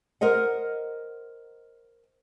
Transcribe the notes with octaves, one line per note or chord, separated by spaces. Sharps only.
A#4 C5 D#5 F#5